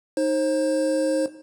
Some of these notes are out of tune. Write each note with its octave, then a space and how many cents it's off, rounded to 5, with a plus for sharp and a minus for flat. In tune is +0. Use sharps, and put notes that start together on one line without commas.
D#4 +0 C5 +35